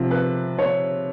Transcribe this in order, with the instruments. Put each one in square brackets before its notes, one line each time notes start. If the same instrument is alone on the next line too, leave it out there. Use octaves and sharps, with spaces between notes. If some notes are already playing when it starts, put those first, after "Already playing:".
Already playing: [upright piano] C3 F3
B4
C#5